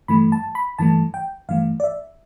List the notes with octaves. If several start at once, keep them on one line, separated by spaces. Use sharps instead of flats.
G2 E3 A3 B5
A5
B5
G2 E3 A3 A5
G5
G2 E3 A3 F5
D5
E5